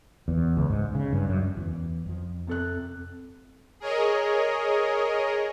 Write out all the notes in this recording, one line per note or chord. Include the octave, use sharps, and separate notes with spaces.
E2
C#2
G#2
C#3
G2
F#2
E2 E3
F2 F3
C3 A4 F#6
G#4 A#4 C#5 D#5